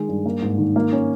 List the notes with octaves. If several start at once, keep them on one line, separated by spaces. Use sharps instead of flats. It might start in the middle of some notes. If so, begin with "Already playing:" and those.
Already playing: D#3 G#3
G2
A#3
G#2
D#3
A#3
C#4